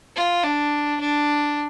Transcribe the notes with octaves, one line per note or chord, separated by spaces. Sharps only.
F4
D4
D4